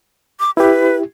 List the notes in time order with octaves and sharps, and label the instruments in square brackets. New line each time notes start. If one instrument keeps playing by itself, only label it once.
[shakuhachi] D6
[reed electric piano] E4 G4 [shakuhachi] B4